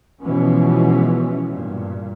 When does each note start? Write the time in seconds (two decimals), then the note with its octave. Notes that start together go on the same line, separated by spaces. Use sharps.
0.21 B2 E3 F3 G#3 B3 C#4
1.51 G2 A#2